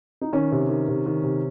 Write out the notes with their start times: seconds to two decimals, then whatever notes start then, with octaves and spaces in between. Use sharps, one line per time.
0.21 D#4
0.33 D#3 C#4
0.52 C3
0.69 D#3
0.88 C3
1.06 D#3
1.24 C3